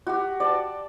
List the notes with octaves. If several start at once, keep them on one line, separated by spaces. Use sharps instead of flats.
F#4 G4
D5 G5 A5